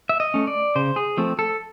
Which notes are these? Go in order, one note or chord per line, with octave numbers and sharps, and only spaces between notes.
E5
D#5
A3 C#4
D5
C#3 C5
G#4
F3 A3 C4
A4